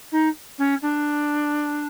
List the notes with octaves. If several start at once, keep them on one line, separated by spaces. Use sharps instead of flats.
D#4
C#4
D4